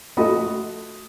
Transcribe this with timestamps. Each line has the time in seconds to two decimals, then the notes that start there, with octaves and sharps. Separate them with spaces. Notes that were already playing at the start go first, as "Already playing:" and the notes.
0.17 A3 F4 F#4 D#5 B5 D#6